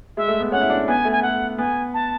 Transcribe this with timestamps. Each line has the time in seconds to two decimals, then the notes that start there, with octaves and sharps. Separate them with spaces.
0.17 G#3 E5
0.28 A3
0.40 B3
0.52 C#4 F#5
0.61 E4
0.70 D4
0.88 B3 G#5
1.05 A3
1.12 G#5
1.22 A3 F#5
1.58 B3 G#5
1.94 A5